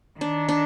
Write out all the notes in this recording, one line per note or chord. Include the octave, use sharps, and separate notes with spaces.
D#3 D4
D4